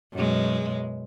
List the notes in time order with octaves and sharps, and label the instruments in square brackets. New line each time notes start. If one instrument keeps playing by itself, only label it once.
[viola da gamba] F#2 B2 G#3